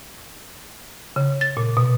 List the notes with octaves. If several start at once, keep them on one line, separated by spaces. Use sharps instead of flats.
C#3
A6
A#2
B2